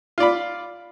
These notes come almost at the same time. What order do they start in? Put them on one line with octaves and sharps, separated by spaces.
F4 D5 B5